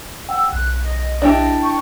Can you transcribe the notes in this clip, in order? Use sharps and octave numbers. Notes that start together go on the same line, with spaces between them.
F#5 G5 E6
B1 F#6
D#5
D4 E4 G4
G5 C#6